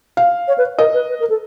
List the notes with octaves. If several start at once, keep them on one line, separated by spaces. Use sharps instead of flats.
F5
C#5
B4
A#4 D#5
B4
B4
A#4
A4